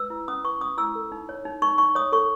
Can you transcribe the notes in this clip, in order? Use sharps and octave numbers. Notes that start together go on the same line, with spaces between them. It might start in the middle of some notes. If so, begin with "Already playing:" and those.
Already playing: B4 E6
E4
C#4 D#6
B4 C#6
C#4 D#6
E4 E6
A4
D#4
C#5
D#4
D#4 C#6
D#4 C#6
C#5 D#6
A4 C#6